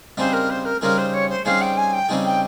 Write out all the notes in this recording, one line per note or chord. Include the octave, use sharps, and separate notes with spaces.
C#3 G3 C4 D#4 G#4 C5
A#4
C5
A#4
C#3 G3 C4 D#4 G#4 A#4
C5
C#5
C5
C#3 G3 C4 D#4 G#4 F5
G5
G#5
G5
C#3 G3 C4 D#4 G#4
G5